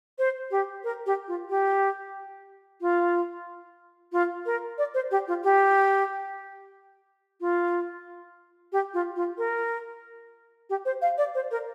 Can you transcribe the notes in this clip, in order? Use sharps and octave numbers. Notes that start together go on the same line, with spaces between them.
C5
G4
A#4
G4
F4
G4
F4
F4
A#4
D5
C5
G4
F4
G4
F4
G4
F4
F4
A#4
G4
C5
F5
D5
C5
A#4